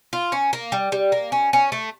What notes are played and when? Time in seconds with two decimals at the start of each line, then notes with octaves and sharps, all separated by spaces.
0.13 F4
0.32 C#4
0.53 A#3
0.72 G3
0.92 G3
1.12 A#3
1.32 C#4
1.53 C#4
1.72 A3